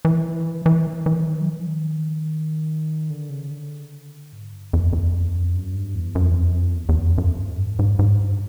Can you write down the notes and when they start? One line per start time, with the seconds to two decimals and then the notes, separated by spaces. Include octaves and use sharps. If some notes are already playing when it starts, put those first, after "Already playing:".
0.05 E3
0.66 E3
1.06 E3
1.26 D#3
1.41 F#3
1.47 F3
1.67 D#3
3.10 D3
3.30 C#3
3.51 D3
4.33 G#2
4.53 G2
4.73 F2
4.93 F2
5.55 F#2
5.75 G2
5.95 E2
6.15 F#2
6.23 F2
6.30 E2
6.37 F2
6.77 E2
6.89 E2
6.98 F2
7.18 F#2
7.38 G2
7.58 G#2
7.79 G#2
7.99 G#2
8.20 G2